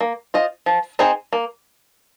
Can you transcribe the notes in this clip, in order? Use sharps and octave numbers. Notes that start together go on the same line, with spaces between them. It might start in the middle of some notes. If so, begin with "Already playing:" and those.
A#3
F4 C5 D#5
F3
C4 D#4 G#4 C5
A#3